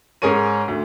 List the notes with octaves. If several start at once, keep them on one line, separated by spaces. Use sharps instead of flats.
G#2 C#4 G#4 A#4 C#5 D#7
D2